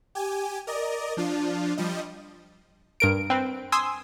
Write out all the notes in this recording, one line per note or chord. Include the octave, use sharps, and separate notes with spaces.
G4 G#5
A#4 D5 D#5
F3 D4 F4
F3 G3 D#5
G2 A#4 D7
C4 B4
G#5 C6 D#6 E6